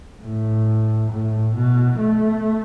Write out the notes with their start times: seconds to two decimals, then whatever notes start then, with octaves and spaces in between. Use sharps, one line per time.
0.23 A2
1.10 A2
1.55 B2
1.99 A3